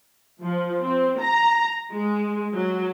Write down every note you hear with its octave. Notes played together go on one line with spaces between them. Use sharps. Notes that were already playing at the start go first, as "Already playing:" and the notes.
F3
C4
A#5
G#3
F#3